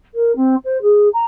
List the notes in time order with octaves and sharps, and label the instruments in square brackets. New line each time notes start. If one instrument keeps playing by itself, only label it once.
[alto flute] A#4
C4
C5
G#4
A#5